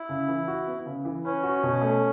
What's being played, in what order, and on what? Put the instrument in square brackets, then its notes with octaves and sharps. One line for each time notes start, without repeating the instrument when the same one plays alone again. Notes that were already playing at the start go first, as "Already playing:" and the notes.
Already playing: [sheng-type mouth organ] E4
[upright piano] C#3
E3
F#4
B3
C#3
E3
[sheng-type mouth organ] C#4 [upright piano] B4
[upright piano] F#4
B2
A3